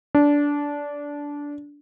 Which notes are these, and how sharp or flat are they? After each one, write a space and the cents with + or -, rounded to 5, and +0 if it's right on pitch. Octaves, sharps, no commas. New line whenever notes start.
D4 -15